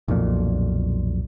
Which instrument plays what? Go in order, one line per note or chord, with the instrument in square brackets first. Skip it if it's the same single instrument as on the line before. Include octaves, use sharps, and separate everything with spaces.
[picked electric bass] B1 F2 A#2